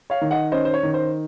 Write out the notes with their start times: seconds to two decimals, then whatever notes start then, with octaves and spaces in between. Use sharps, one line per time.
0.10 C#5 F5
0.21 D#3
0.31 D#5 F#5
0.52 C#4 C5 D#5
0.65 C5
0.74 C#5
0.83 D#3
0.94 C5